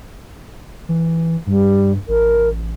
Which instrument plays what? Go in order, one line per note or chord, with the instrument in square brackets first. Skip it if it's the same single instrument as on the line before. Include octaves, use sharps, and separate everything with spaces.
[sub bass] E3
[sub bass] G2 [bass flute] G3
[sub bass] A1 [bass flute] A#4